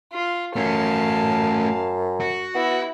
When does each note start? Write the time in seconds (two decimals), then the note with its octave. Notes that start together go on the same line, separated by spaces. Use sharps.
0.12 F4
0.56 F#2 A3 C#4 F5 A5
2.20 F#4
2.55 B3 E4